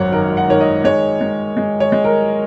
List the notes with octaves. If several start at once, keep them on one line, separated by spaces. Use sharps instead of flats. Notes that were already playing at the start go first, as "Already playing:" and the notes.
Already playing: G#1 F#2 C#5 F#5
D#3 A#4
F#5
D#3 C#5
D#5
G#3 C#5
G#3
G#3
C#5
G#3
A#4